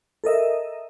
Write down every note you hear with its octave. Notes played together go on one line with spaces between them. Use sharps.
A4 A#4 D#5 E5